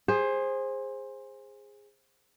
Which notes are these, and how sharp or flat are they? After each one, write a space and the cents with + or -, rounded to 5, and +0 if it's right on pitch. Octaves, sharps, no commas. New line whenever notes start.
G#4 -15 C5 +15